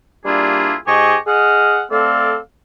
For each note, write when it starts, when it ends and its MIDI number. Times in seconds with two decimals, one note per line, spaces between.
0.25 0.74 55
0.25 0.74 58
0.25 0.74 62
0.25 0.74 64
0.25 0.74 65
0.25 0.74 68
0.86 1.16 44
0.86 1.16 67
0.86 1.16 68
0.86 1.16 75
0.86 1.16 80
0.86 1.16 85
1.27 1.82 68
1.27 1.82 75
1.27 1.82 78
1.27 1.82 89
1.91 2.36 57
1.91 2.36 60
1.91 2.36 69
1.91 2.36 74
1.91 2.36 77